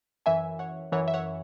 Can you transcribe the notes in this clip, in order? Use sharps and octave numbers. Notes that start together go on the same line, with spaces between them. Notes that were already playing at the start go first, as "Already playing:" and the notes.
F#2 E3 E5 G#5
C#5 F#5
F#2 E3 C#5 F#5
E5
C#5 F#5